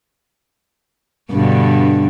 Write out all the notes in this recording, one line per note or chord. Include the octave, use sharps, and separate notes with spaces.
G2 B2 D3